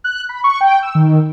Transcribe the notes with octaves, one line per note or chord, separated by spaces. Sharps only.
F#6
B5
C#6
G5
E6
D#3